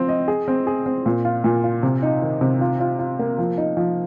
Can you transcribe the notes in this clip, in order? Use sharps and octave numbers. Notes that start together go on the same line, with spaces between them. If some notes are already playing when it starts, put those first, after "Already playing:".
Already playing: F3 C4
D#5
G#4
C4
G#4
C4
A#2
F4
A#2
F4
C3
D#4
D#3
C3
F4
F4
F4
A#3
F3
D#4
F3